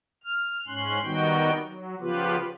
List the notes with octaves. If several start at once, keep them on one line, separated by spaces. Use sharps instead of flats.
F6
G#2 C#4 C6 F#6
D#3 G3 B3 D#4 F#4 G5
F#3
C#3 F3 B3 F4 G4 B4